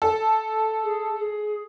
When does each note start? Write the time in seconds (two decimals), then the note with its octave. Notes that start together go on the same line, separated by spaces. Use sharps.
0.02 A4
0.82 G#4
1.17 G#4